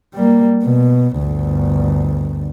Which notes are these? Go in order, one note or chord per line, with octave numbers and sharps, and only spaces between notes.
G3 A#3
B2
G1 D2